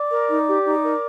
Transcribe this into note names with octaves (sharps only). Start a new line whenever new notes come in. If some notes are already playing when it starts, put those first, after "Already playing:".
Already playing: D5 D6
A#4
D#4
G4
D#4
A#4